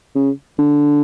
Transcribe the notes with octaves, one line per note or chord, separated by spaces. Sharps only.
C#3
D3